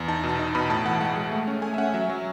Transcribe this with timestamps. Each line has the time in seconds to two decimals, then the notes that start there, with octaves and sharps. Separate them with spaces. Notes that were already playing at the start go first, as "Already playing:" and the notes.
Already playing: E2
0.08 D#4 A5
0.24 B2
0.29 A5
0.39 D#4
0.55 B2 B5
0.70 A2 A5
0.86 E3 F#5
1.00 G#3 F#5
1.16 G#3
1.32 A3
1.47 C#4
1.62 A3 G#5
1.74 E5
1.78 C#4 F#5
1.94 F#3 E5
2.10 F#3